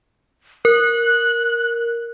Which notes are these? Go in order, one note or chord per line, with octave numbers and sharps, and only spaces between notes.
A#4 F#6